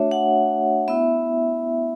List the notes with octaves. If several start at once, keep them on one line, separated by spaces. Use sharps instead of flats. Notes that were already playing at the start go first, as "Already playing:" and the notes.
Already playing: A3 D4 F#4 C#5 E5
F#5
B3 E4 E5